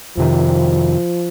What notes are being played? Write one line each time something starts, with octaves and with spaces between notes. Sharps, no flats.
F2 C3 D#3 F3